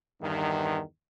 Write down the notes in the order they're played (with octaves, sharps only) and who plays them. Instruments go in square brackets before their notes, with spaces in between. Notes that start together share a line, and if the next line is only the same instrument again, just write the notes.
[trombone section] E2 G2 D#3